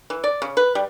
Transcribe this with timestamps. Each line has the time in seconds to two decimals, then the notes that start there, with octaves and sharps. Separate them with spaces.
0.10 E3
0.24 D5
0.42 C#3
0.57 B4
0.75 G3